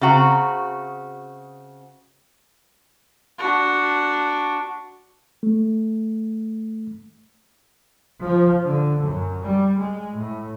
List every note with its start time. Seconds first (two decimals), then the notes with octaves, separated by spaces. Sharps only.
0.01 C#3 C4 F#4 A#5
3.38 D4 F#4
5.43 A3
8.22 F3
8.63 D3
9.03 F#2
9.44 G3
9.80 G#3
10.16 A2